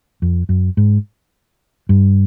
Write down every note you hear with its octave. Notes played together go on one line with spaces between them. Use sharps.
F2
F#2
G#2
G2